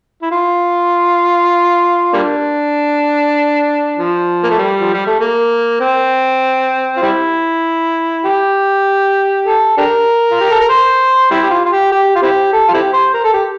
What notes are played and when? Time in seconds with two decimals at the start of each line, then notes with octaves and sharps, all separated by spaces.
0.22 E4
0.31 F4
2.13 G3 A#3 D4
3.97 F3
4.44 A#3
4.50 A3
4.58 G3
4.80 F3
4.94 G3
5.06 A3
5.20 A#3
5.80 C4
6.97 F4
7.02 G3 C4 E4
8.25 G4
9.47 A4
9.77 D4 G4 A#4
10.31 F4
10.40 G4
10.50 A4
10.60 A#4
10.69 C5
11.31 G3 C4 E4
11.43 G4
11.50 F4
11.65 F4
11.72 G4
11.92 G4
12.16 F4
12.22 C4 E4 G4
12.53 A4
12.68 F4
12.74 C4 E4 G4
12.93 C5
13.13 A#4
13.24 A4
13.34 G4